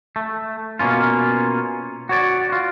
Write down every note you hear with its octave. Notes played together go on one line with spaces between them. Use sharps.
A3
B2 A#3 C#4 F4
F#4 C#5 D5
F4 F#4